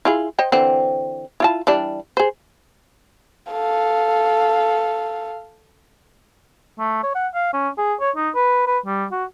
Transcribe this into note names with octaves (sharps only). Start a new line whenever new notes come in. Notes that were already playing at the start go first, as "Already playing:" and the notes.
E4 F4 G#4
C5 D#5 G5
D3 E3 C4
E4 F4 A5
E3 G3 D4
G#4 C5
A4 F5
A3
C#5
F#5
F5
C#4
G#4
C#5
D#4
B4
B4
G3
F#4